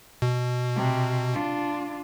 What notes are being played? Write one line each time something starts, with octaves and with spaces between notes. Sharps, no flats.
B2
C3
D4 F4